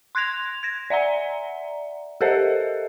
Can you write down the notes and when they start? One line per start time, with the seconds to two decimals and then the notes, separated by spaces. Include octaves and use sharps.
0.15 C6 F#6 G#6 A#6 F7
0.63 G#6 A#6
0.90 D5 E5 F#5 A#5
2.21 G4 A4 A#4 C5 D#5 E5